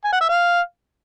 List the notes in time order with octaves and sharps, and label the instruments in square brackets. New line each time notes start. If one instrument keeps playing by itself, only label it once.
[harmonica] G#5
F#5
E5
F5